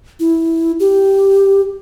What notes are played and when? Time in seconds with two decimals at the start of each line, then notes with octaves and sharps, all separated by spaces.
0.20 E4
0.80 G4